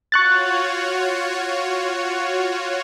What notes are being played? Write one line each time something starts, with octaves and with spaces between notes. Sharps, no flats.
F4 F#4 C#5 C#6 F#6 A6